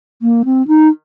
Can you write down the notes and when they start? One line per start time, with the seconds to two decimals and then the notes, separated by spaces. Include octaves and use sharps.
0.22 A#3
0.45 C4
0.68 D#4